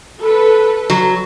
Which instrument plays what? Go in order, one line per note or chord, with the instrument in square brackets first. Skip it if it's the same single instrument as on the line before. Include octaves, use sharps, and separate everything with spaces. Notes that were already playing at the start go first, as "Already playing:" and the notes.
[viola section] A4 B4
[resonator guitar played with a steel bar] F#3